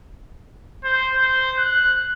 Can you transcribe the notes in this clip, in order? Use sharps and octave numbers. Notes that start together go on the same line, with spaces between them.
C5
C5
F#6